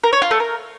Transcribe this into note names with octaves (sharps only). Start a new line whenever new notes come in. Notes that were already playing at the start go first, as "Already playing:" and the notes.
A#4
C#5
F4
A3
A#4